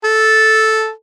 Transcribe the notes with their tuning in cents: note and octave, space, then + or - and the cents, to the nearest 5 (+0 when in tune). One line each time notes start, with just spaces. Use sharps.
A4 -5